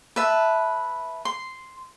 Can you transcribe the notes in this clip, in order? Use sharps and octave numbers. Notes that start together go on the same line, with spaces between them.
B4 E5 A5
C6